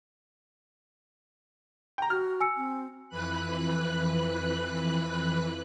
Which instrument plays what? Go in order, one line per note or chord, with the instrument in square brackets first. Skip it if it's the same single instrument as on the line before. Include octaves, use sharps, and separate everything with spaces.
[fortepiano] G5 A#5
[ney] F#4 [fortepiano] F6
[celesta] G#5 E6 C#7
[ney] C4
[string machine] F2 E3 B4 B5 F#6